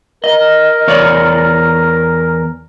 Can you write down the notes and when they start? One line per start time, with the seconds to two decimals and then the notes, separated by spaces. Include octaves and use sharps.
0.24 A#4 D#5
0.88 E2 C#5 D5